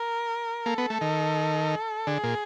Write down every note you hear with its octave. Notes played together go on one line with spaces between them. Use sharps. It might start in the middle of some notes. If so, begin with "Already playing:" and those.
Already playing: A#4
A#3 A4
B3
A3
D#3
D3 G#4
A#2